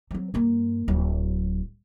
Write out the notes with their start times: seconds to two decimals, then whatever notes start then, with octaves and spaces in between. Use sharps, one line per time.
0.11 F#3 C4
0.34 G2 A#3
0.88 D1 F#3